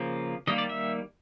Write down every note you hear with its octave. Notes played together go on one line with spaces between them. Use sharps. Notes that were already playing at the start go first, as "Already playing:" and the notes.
Already playing: C#3 F3 A#3
D#3 G3 A#3 D#5
D5
E5